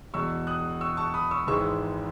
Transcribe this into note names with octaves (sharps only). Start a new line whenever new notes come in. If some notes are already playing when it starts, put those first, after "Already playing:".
E1 E2 B2 C#6 E6
D#6 F#6
C#6 E6
A5 C#6
B5 D#6
C#6 E6
G#1 G#2 E3 G#3 C#6 E6